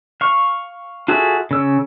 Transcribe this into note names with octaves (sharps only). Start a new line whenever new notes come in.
F5 C#6
F4 F#4 G#4 A4 E5
C#3 E6